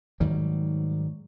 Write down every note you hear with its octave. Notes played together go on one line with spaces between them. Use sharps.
G#2 D#3 F#3 G3